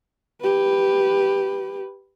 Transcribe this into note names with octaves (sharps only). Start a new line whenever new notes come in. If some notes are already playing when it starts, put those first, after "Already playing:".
G4 B4